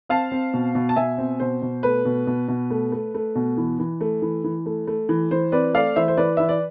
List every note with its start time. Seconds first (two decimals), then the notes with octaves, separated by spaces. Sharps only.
0.09 C4 F5 A5
0.32 C4
0.54 B2
0.75 B2
0.89 A5
0.96 B2 E5 G#5
1.18 C4
1.40 B2 C5
1.62 B2
1.83 A3 B4
2.05 B2
2.27 B2
2.48 B2
2.70 A3
2.92 A3
3.14 A3
3.35 B2
3.57 E3
3.79 E3
4.01 A3
4.22 E3
4.44 E3
4.66 A3
4.87 A3
5.09 E3
5.31 E3 C5
5.52 C4 B4 D5
5.74 A3 D5 F5
5.96 E3 C5 E5
6.08 C5
6.17 E3 B4 D5
6.37 E3 E5
6.49 D5